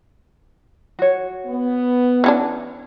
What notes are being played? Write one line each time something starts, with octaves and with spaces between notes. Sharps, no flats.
F#4 C#5
B3
E3 C#4 D4